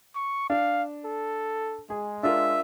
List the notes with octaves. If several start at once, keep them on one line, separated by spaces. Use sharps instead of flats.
C#6
D4 F5
A4
G#3 G#4
D4 F4 A#4 E5